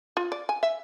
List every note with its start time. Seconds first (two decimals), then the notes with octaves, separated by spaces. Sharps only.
0.17 F4
0.32 D5
0.49 G#5
0.63 E5